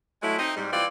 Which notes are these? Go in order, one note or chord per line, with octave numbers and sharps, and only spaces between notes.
F#3 G#3 A3 E4
C4 D#4 D#5
G#2 G3
E3 C4 F4 D5